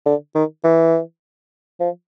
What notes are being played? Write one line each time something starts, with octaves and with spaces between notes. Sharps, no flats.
D3
D#3
E3
F3